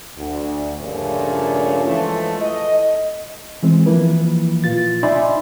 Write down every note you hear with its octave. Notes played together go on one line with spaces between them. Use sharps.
D2
G2 A#2 C#3 F3 A3 C#4
E3 F3 G#3 A3
D#5
E3 G#3 C4
E3 F3 A#3 E4 B4
A#2 F4 A6
D#4 D5 E5 G#5 B5 C6